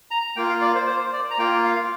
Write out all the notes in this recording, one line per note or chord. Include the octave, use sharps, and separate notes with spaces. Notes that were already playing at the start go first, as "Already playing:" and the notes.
A#5
A#3 F4 G5
F5
D5
C5
C5
D5
A#5
A#3 F4 G5
F5